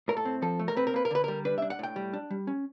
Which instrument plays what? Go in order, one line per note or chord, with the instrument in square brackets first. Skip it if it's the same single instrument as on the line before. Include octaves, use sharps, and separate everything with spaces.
[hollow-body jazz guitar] A2 A#4
A4
C4
F3 A4
A3
A#4
C4 B4
A#4
A#3 B4
A#4
D3 B4
G3 A#4
D4 B4
E5
D4
F#5
A2 G5
G3
D4
G3
C#4